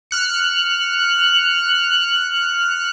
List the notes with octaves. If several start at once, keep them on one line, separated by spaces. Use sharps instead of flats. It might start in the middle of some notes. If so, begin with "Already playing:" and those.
F6 F#6 C#7